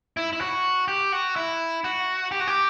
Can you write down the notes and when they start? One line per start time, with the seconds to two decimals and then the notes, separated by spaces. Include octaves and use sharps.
0.17 E4
0.33 E4
0.41 F#4
0.88 G4
1.12 F#4
1.36 E4
1.84 F#4
2.31 G4
2.40 F#4
2.47 G4